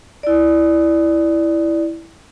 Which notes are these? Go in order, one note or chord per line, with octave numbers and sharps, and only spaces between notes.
E4 D5